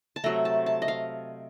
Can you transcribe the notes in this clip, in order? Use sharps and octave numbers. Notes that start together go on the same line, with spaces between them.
A5
C3 F#3 A3 A#5
A5
A5
D#5
F5